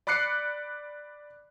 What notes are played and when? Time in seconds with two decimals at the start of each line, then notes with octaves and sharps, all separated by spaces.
0.07 D5 B5 D6 F#6 C7 C#7